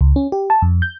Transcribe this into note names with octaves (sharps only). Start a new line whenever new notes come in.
C#2
C#4
G4
A5
F2
G6